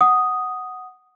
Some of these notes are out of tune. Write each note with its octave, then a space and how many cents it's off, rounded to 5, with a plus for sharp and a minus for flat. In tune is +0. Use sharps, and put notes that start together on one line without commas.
F#5 +0 D#6 +0